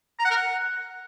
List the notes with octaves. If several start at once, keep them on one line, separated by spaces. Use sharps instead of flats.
A#5
F#5
A#4
F#5